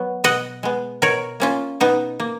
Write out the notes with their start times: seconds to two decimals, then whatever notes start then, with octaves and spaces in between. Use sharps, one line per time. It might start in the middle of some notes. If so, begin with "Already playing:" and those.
Already playing: F#3 B3
0.24 B2 D#5 F#5
0.63 G#3 B3
1.02 B2 A#4 C#5
1.40 A#3 C#4 F4
1.80 B2 B3 D#4
2.20 A#3